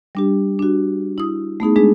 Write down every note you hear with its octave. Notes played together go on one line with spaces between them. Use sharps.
G3 D4 G4
D4 F#4
E4 D#6
A3 B3 D#4 G#4
G#3 D4 G#4